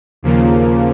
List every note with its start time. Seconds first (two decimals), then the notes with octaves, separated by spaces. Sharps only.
0.23 D#2 C#3 F3 A#3